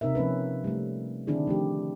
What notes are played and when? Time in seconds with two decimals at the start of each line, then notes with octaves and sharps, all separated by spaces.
0.01 C3 C4 D#4 A#4 E5
0.15 F3 A#3 C#4 B4
0.64 G3 A3
1.27 D3 D#3 C4 D4 E4 G#4
1.47 F3 A3 G4